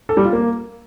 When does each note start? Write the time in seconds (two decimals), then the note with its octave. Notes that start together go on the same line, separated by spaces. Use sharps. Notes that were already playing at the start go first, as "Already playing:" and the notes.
0.09 A4
0.17 G3
0.25 F4
0.33 A#3